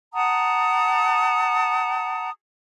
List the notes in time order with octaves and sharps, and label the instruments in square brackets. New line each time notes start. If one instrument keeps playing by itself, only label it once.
[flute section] F#5 A5 A#5 D#6